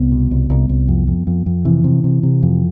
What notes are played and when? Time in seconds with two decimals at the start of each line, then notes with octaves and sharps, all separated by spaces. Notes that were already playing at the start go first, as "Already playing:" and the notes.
Already playing: C2 B3
0.12 B2
0.31 C2
0.50 C2
0.69 C2
0.88 F2
1.08 F2
1.27 F2
1.46 F2
1.65 C3 E3
1.84 C3
2.04 C3
2.23 C3
2.43 F2